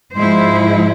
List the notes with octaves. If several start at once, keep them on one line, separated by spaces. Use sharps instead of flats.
G#2 F3 G#3 E4 C5